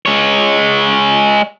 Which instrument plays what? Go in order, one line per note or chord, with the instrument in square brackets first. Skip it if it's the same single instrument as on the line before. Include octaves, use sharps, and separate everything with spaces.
[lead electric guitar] G#3 C#5